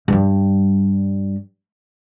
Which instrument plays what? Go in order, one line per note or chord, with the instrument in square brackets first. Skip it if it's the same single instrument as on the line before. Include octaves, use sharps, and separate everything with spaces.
[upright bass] G2 G3